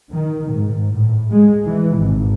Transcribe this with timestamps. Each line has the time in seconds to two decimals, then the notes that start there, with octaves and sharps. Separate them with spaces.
0.12 D#3
0.53 G#2
0.93 A2
1.31 G#3
1.65 E3
1.98 G#1